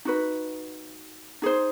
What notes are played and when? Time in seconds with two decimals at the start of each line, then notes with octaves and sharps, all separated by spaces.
0.05 D#4 F#4 B4
1.42 D#4 G#4 C5